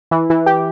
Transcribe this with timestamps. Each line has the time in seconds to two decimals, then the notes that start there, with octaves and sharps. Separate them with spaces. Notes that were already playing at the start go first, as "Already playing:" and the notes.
0.11 E3
0.30 E3
0.46 G4